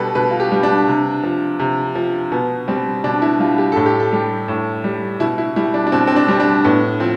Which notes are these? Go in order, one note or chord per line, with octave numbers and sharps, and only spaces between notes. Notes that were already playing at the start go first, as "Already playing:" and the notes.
Already playing: B2 G3 A4 B4
B2 B4
F4
G4
G3
D4
C3
F3
C3
F3
B2 B3
G3 C4
B2 D4
E4
G3 F4
G4
A2 A4
G4
A4
G3 G4
A2
G3
B2 E4
E4
G3 E4
D4
D4
B2 C4
C4
D4
G3 C4
D4
A2 B3
F3 C4